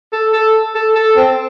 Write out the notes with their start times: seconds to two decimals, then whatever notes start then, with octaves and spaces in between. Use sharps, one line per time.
0.13 A4
0.33 A4
0.75 A4
0.95 A4
1.16 C4